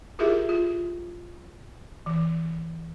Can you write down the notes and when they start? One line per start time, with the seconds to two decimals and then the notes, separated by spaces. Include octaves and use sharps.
0.19 E4 F4 G4 G#4 A#4 E5
0.49 F4
2.06 E3